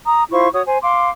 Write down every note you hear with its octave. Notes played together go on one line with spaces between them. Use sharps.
A#5 D#6
E4 F4 C5 C#6
F#4 C#5 D#6
C5 G#5
F5 C6 D6